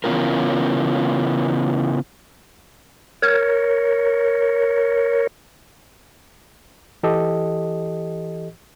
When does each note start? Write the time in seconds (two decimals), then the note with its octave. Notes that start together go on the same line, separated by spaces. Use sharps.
0.04 C#3 E3 B3 C#4 F4 A#4
3.22 A#4 C#5
7.03 E3 G4 A4 D#5